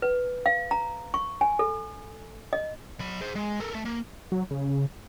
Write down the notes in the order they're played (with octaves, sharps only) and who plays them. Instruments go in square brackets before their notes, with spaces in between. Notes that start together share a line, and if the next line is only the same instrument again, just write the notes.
[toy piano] B4
F5
A#5
C#6
G#5
A4
D#5
[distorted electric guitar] F#3 B5
G#4 C5
G#3
A4 A#4
A3 A4
A#3
[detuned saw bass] F#3
C#3